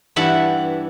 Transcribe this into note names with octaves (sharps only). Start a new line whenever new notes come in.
G2 E3 E5 F#5 A5 B5